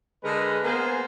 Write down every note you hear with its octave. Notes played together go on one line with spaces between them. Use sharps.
D3 G#3 G#4 A#4 B4
A#3 B3 G#4 C5 G#5